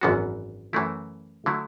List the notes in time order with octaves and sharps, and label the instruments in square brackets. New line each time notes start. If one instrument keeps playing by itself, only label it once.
[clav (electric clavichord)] G#1 F#2 E3 B3 F#4
F#2 E3 A3 E4
D3 F#3 A3 E4